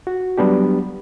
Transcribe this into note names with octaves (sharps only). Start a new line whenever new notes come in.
F#4
F#3 G3 B3 D4 G4